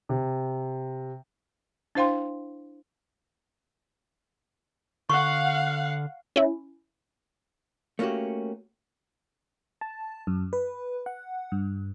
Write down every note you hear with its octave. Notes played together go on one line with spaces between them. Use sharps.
C3
D4 E4 C5 F5 G5 C6
D3 F5 F#5 C#6
C#4 E4
A3 A#3 C#4 D#4 F#4 G4
A5
F#2
B4
F#5
G2